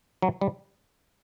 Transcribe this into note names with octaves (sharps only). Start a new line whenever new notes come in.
F#3
G3